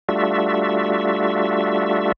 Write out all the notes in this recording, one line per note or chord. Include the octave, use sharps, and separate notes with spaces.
G3 A3 D4 F4 F#4 E5